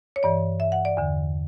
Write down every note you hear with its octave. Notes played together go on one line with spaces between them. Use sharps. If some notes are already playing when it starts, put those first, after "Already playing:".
C#5
G2 E3 D5
E5
F#5
D5
E2 D3